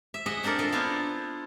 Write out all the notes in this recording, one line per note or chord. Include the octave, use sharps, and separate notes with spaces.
E5
G#4 D#5 E5 F#5
C4 D4 A4 A#4 D5
C4 F4 A4 D#5
B3 D4 E4 F4 C5